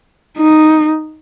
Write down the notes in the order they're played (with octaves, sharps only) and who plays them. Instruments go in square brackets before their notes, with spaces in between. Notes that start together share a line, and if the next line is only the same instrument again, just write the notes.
[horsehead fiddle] D#4